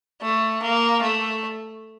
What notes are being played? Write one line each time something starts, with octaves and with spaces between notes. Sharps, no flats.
A3
A#3
A3